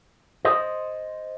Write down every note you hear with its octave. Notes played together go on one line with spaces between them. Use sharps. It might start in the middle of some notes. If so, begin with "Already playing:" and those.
C5 D#5